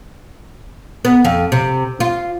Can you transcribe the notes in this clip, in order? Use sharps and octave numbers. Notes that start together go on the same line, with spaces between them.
B3
F2
C3
F4